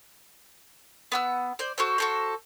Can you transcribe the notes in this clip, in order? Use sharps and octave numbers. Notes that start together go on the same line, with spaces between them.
B3 F#5 E6
C5 D5
F#4 A4 C5
F#4 A4 C5